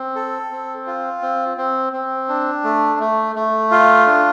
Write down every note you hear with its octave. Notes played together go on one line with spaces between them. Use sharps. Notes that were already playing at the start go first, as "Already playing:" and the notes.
Already playing: C4
A4
C4
F4
C4
C4
C4
D4
A3
A3
A3
F4
D4